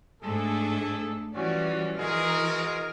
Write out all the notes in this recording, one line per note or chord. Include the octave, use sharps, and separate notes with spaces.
G#2 A3 D4 G#4 A4
E3 F3 G3 C#4 F#4 D5
E3 G#3 F#4 G#4 A#4 D#5 F6